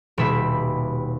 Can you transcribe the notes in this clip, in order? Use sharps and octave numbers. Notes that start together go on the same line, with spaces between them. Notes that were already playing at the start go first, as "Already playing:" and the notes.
D#1 B2 G3 E5 B5